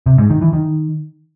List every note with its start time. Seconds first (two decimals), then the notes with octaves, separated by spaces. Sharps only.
0.06 C3
0.18 G#2
0.30 D#3
0.41 E3
0.53 D#3